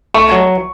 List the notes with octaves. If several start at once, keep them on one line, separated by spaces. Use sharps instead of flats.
A3 C#6
F#3